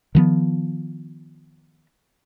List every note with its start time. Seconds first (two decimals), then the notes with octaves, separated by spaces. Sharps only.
0.15 D#3 F3 B3